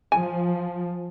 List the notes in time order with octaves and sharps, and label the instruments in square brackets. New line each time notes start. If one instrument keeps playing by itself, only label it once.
[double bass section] F3 [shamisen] G#5